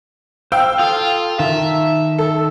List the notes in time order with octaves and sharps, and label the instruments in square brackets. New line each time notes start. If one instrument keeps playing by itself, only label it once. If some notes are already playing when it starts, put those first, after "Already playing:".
[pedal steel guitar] C5 [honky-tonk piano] F5 G5 E6
[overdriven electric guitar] F4 [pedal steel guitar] A4 D#6
[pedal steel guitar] D#3 A5 [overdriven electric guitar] E5
[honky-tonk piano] A4